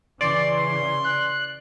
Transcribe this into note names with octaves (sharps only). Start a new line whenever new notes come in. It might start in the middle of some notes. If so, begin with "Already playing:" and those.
C#3 E3 D5 C6
C6
F#6